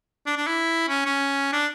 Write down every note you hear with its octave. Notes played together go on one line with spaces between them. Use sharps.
D4
D4
E4
C#4
C#4
D4